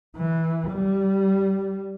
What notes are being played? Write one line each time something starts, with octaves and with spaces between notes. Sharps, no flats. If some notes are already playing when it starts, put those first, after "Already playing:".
E3
G3